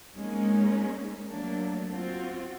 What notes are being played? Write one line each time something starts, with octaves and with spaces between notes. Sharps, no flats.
G#3 A#3 C4 C#4 D#4
F#3 A3 A#3 D4
C4 F4 F#4